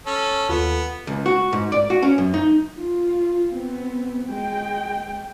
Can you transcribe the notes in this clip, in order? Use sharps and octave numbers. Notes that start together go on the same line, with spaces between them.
C#4 A4
D#2 B3 F4 A4
C#2
F#4
G#2
D5
F#4
C#4
F#2
D#4
F4
B3 C4
G#3 G5